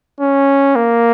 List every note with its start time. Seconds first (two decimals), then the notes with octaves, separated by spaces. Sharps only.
0.20 C#4
0.76 A#3